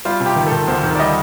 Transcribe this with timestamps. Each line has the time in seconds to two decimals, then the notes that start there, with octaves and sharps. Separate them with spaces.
0.05 G3 F4
0.20 C3
0.26 G4
0.36 D#3
0.46 A4
0.52 D#3
0.68 D2 C5
0.83 D#3
0.95 D5
0.99 G3 D#5